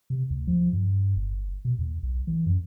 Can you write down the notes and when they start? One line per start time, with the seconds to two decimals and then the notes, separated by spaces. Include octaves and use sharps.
0.10 C3
0.30 D2
0.47 F3
0.73 G2
1.16 G1
1.65 B2
1.79 D#2
2.03 B1
2.27 E3
2.46 F#2